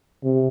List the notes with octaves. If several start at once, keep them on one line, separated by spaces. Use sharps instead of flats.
C3